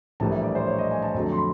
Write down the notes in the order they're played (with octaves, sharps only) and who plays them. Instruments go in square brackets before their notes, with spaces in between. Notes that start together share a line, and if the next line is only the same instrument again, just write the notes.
[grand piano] A#1 A2 E3 G3 A#3 A5
E5
D5
C5
C#5
D#5
G#5
A5
F2 D3 F#3 A3 A#5
C6
B5